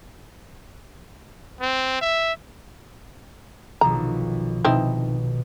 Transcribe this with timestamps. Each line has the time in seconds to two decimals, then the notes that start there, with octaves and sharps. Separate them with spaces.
1.61 C4
2.01 E5
3.81 B1 D#3 F3 A#5
4.65 B1 B2 C4 D#4 E4